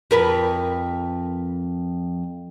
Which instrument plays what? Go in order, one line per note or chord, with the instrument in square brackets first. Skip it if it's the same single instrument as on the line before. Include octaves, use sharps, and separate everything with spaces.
[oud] F2 A#4 B4